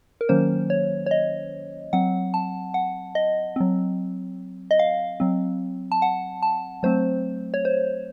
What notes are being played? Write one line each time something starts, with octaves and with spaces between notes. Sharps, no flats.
A#4
D#3 F#3 A#3 C#4 C5
C#5
C#5
D#5
F#3 C4 F#5
A5
F#5
D#5
F#3 C4
D#5
F5
F#3 C4
A5
F#5
A5
F#3 A3 C4 C5
C#5
C5